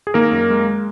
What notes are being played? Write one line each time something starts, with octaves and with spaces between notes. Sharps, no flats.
G#4
D#3 A#3 A#4
F#2
G#3